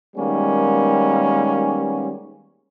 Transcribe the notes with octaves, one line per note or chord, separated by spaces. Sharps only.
D#3 G3 G#3 A#3 B3 C#4